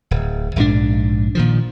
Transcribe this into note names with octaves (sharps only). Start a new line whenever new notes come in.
D1
A#1 G#2 F3 D4
A#2 D#3 F3